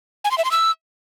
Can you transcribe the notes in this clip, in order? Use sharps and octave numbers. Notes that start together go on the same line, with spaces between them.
G#5
C6
E5
C6
E6